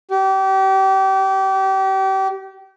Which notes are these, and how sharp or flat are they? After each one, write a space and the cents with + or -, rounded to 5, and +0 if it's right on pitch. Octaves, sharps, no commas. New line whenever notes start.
G4 -35